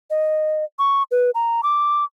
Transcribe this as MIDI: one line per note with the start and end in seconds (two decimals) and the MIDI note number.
0.10 0.64 75
0.79 1.03 85
1.11 1.31 71
1.35 1.61 82
1.63 2.04 86